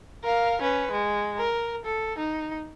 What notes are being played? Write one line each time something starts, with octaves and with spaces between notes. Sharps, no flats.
A#4 F5
C#4 B4
G#3
A#4
A4
D#4